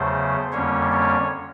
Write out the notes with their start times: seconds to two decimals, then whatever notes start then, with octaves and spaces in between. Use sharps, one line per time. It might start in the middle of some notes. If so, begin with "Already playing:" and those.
Already playing: E2 C#3 F#3 A3 C5
0.52 F2 D3 G3 A#3 C#4 C#5
0.92 C#5